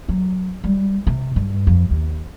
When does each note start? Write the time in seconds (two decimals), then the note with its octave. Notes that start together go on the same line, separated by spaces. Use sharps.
0.09 F#3
0.64 G3
1.07 C3
1.36 G2
1.67 F2
1.91 D#2